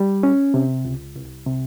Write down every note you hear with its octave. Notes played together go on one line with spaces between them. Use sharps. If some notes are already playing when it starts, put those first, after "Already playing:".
Already playing: G3
C#4
C3
C#2
C2
C3